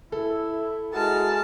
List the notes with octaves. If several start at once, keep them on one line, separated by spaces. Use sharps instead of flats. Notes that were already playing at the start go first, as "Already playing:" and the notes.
E4 A4
G#3 E4 F#4 A#4 A5 F6